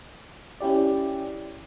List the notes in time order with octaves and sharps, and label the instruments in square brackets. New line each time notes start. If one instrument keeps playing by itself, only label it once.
[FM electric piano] C#4 E4 G4 D5